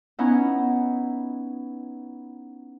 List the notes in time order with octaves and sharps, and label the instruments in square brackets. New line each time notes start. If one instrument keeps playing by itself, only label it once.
[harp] B3 C#4 D#4 E4